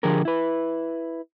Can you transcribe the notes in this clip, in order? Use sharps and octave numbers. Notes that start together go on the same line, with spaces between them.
D3 F3 G4 G#4 A#4
E4 B4